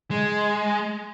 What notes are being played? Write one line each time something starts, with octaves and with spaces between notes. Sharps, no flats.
G#3